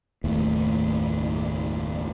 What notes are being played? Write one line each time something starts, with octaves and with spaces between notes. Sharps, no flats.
F#1 D#2 A2